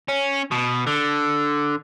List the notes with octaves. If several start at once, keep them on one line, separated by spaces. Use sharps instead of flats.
C#4
B2
D3